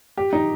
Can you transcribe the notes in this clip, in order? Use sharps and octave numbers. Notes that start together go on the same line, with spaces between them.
G4
D#4